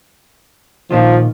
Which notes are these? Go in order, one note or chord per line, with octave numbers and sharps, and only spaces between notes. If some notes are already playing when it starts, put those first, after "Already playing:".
A#2 D#3 F3 F4